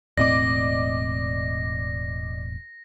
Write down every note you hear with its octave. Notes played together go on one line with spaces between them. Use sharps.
E1 A2 C4 D5 D#5 D6 A#6